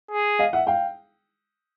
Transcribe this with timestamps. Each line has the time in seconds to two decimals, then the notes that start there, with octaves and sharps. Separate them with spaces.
0.11 G#4
0.39 D#5 F5
0.53 E5 F#5
0.67 F5 G5